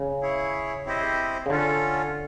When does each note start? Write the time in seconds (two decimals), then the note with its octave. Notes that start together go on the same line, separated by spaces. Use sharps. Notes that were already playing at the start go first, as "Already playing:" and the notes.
Already playing: C#3
0.22 E4 G#4 C#5
0.86 C4 E4 G4 C5 D#5
1.46 C#3
1.50 D3 C#4 F4 A4